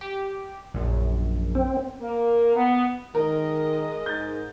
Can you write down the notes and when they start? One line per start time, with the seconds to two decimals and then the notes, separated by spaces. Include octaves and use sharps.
0.01 G4
0.74 A#1 F#2
1.55 C4
2.01 A#3
2.56 B3
3.15 D#3 G#3 A#4 D#5
4.06 G#2 G6 A6